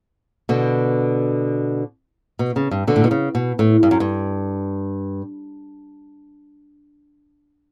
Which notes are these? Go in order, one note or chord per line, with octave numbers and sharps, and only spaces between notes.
B2 D3
B2
C#3
G2
B2 D3
A2
B2
C#3
B2
A2
G2
F#2
G2